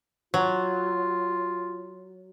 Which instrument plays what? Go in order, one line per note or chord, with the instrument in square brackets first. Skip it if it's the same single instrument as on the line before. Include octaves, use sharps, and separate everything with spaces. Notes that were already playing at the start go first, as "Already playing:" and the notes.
[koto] F#3 [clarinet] F4